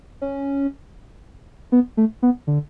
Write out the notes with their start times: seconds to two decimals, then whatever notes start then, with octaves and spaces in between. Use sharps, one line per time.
0.21 C#4
1.72 B3
1.97 A3
2.22 B3
2.47 D3